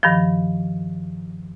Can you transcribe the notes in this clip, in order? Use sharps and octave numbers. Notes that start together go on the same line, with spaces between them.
G2 D#3 F3